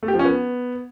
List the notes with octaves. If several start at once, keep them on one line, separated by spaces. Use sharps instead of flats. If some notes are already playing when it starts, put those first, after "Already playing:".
A3
G4
F3
C#4
B3